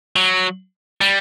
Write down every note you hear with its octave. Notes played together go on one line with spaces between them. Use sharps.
F#3
G3